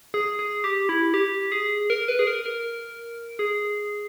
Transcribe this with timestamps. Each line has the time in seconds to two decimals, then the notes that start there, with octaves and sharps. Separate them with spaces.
0.14 G#4
0.39 G#4
0.64 G4
0.89 E4
1.14 G4
1.52 G#4
1.90 A#4
2.08 B4
2.19 G#4
2.27 A#4
2.46 A#4
3.39 G#4